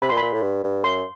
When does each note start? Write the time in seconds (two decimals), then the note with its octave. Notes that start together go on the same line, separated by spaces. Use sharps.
0.02 C3 B5
0.09 A#2 C6
0.17 B5
0.22 A#2
0.33 A2
0.42 G2
0.64 G2
0.84 F#2 C6